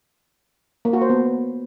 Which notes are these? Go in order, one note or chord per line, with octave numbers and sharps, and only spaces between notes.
A#3
F#4
C5
B3